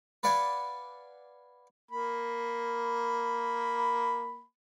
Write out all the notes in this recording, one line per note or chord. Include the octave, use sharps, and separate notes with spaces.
B4 D5 F5 F#5 G#5
A#3 B5